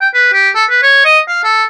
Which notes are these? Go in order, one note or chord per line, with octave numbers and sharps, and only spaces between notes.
G5
B4
G4
A4
B4
C#5
D#5
F5
A4